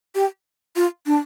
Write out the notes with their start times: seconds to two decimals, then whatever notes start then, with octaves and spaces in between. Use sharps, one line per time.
0.15 G4
0.76 F4
1.06 D4